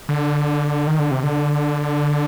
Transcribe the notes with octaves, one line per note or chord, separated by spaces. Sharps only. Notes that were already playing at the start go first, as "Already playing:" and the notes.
D3
D#3
D3
C3
D3